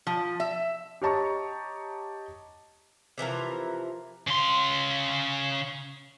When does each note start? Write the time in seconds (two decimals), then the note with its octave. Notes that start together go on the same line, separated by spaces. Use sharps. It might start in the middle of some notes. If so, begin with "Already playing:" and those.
0.07 F3
0.40 E5
1.02 G4 C#5 D#5 A5 A#5 C#6
3.18 C3 E3 F3 A#4
4.27 C#3 C6